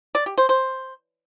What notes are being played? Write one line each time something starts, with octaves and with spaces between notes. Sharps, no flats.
D5
G4
C5
C5